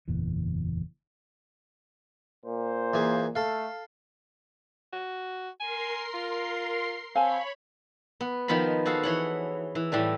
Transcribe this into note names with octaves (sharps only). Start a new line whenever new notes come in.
F#1 E2 A#2 E3
A#2 C5
E3 A#3 G#4
A3 A4 F5
F#4
A#4 G#5 C6 C7
F4
C4 C#5 F5 G#5 A5 B5
B3
D#3 F3 B3 F4 B5
F#4 G#4 A4 F5
E3 C#5 F#5
E3
A2 E3 G3 A3